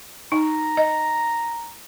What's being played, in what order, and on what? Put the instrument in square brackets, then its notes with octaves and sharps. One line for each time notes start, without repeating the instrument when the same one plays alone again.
[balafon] D#4 [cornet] A#5
[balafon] D#5